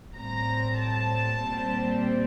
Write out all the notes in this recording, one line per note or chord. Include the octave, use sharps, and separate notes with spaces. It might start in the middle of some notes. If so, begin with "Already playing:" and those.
A2 G3 C4 A#5
A5
A#2 G3 C4